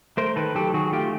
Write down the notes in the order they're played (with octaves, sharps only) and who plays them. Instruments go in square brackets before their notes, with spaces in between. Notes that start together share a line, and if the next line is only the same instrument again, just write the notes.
[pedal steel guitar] A3 A#4 C5
D#3 A4 B4
F#3 G4 A4
D#3 F#4 G#4
A3 F4 G4